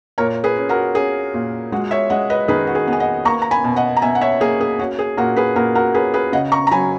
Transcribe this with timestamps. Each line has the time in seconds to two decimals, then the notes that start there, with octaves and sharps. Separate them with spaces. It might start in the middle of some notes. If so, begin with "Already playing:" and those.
0.18 A#2 A#4 C#5
0.44 G#4 B4
0.57 C#4
0.69 F#4 A#4
0.95 C#4 G#4
1.34 A#2
1.72 G#3 F#4
1.91 C#5 E5
2.10 G#3 D#5 F#5
2.30 B4 D#5
2.48 D#3 G#4 B4
2.67 F#4
2.75 G#4
2.87 B3
2.93 G#5
3.00 D#5 F#5
3.25 A#3 A#5 C#6
3.42 A#5
3.51 G#5 B5
3.64 B2
3.76 D#5 F#5
3.97 A#5
4.02 B2 E5 G#5
4.15 F#5
4.21 C#5 E5
4.41 A#3 G#4
4.60 G#4
4.79 C#4 F#4
4.99 G#4
5.17 A#2 F#4 A#4
5.36 G#4 B4
5.56 A#2 F#4 A#4
5.75 F#4 A#4
5.94 C#4 G#4 B4
6.14 G#4 B4
6.32 C#3 D#5 F#5
6.52 A#5 C#6
6.67 A#5
6.71 F#3 G#5 B5